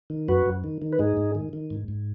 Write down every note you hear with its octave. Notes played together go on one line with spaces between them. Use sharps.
D#3
F#2 F#4 B4
F#2
D#3
D#3
B4
G#2 D#4 G#4
G#2
D#3
D#3
G#2
G#2